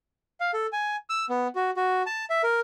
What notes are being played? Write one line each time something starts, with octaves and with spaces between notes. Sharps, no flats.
F5
A4
G#5
E6
B3
F#4
F#4
A5
E5
A#4